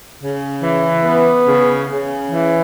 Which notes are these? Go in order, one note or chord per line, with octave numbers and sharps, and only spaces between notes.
C#3
E3
B3
C#3
C#3
E3